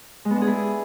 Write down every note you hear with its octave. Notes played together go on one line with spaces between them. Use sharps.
G#3
B3
D4
G#4
E4